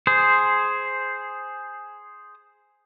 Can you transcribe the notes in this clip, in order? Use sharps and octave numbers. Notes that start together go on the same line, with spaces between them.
G#4 C5